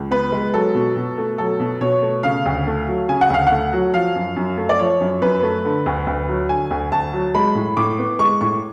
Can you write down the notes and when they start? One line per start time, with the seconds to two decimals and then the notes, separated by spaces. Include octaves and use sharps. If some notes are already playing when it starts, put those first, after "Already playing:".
Already playing: C#2
0.11 B3 B4
0.32 G#3
0.53 F#3 A4
0.75 B2
0.96 B2
1.18 A3
1.38 F#3 A4
1.60 B2
1.81 B2 C#5
2.02 A3
2.23 C#3 F5
2.46 D2
2.67 A3
2.88 F#3
3.09 C#3 G#5
3.21 F#5
3.30 D2 F5
3.47 A3 F#5
3.73 F#3
3.94 F3 F5
4.15 F#2
4.36 F#2
4.58 A3
4.69 D5
4.79 F3 C#5
5.00 F#2
5.22 F#2 B4
5.43 A3
5.65 D3
5.86 D2
6.07 D2
6.28 F#3
6.49 D3 G#5
6.71 D2
6.92 D2 A5
7.13 F#3
7.35 G#3 B5
7.55 A2
7.77 A2 D6
7.99 B3
8.19 G#3 C#6
8.41 A2 C#6